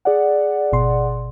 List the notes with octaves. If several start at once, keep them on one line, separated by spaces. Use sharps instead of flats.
G#4 D5 F#5
G#1 B2 C6